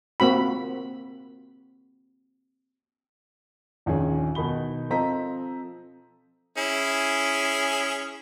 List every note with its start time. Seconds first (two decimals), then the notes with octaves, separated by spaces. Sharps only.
0.20 A#3 C4 F#4 B5
3.86 A#1 D#2 C#4 G#4
4.35 B2 D#3 D#4 B5 G7
4.90 F3 C4 A4 D#5 A#5 B6
6.58 C#4 E4 G#4